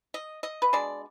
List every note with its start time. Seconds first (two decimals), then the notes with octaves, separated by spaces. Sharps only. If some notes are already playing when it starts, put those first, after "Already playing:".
0.14 D#5
0.43 D#5
0.62 B4
0.73 B2 G#3 D4 D5